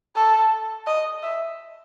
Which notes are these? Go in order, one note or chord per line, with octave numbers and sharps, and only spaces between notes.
A4
D#5
E5